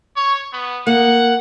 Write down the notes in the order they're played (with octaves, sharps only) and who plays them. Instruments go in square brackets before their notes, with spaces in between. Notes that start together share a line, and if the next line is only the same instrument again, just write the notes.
[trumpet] C#5
B3
[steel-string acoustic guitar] A#3 [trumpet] F#5